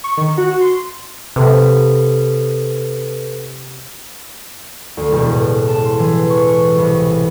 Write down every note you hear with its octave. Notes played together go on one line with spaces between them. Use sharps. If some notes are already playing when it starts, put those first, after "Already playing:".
C#6
D#3
F#4
C6
C3 A4 B4
D2
E1
A2
A5
C6
E3
C#6
C2